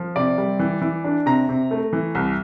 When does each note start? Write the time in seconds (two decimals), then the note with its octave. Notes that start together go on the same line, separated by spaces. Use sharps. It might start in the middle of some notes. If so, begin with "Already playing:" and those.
Already playing: F3
0.16 C3 D5
0.38 G3
0.59 E3
0.81 E3
1.04 D4
1.26 C3 A#5
1.49 C3
1.71 A3
1.93 E3
2.15 C2